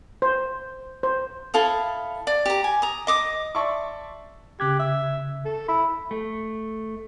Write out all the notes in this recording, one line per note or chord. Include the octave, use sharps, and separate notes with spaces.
C5
C5
E4 A4 F5 D#6
D5
G4 A#5
G#5
A#5 D#6
D#5 D6 D#6
D5 E5 A5 C6 C#6
C#3 G4 F#6 G#6
E5
A4
E4 B5
A3